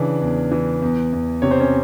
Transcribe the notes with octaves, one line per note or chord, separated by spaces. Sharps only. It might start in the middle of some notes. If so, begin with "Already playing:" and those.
Already playing: C#3 E3 D4 D5
E2
E3
E2
E2
C3 C#5
C5
C#4 C#5